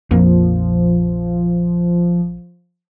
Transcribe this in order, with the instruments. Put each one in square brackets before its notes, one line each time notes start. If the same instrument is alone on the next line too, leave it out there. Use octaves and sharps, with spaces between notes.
[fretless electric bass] A#1 F2 A#3 [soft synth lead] F3